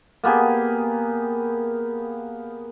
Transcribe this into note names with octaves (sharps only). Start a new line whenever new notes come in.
A#3 B3 G4 G#4